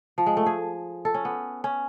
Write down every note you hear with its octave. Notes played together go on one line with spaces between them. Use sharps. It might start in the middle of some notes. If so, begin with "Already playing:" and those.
F3
G#3
A3
G#4
A4
C#4
B3
C#4